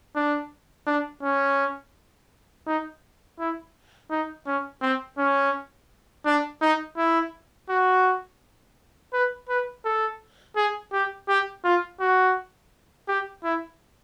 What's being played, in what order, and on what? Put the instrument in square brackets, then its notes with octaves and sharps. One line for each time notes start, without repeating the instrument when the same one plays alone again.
[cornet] D4
D4
C#4
D#4
E4
D#4
C#4
C4
C#4
D4
D#4
E4
F#4
B4
B4
A4
G#4
G4
G4
F4
F#4
G4
E4